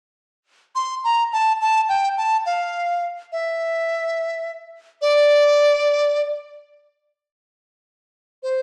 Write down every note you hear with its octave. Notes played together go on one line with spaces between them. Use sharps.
C6
A#5
A5
A5
G5
A5
F5
E5
D5
C5